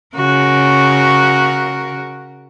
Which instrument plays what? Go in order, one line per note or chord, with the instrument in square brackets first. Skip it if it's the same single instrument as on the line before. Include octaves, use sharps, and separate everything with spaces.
[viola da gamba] C#3 F#4 A#4